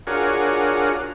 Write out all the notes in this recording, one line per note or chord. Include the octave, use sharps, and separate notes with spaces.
D4 F4 F#4 G#4 A#4 C#5